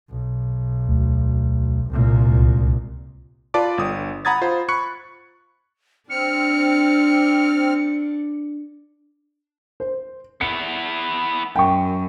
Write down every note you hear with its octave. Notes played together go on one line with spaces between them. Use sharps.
B1
D2
C2 A#2
C#2
F4 B4 D5 A5 D6
G1 D#6
F#5 A#5 B5 D#6 G#6 A6
F4 C5 B5
B5 C#6 F#6 C#7
C4 D4 F6 C#7
C5
B3 E4 C#7
F#2 G5 C#6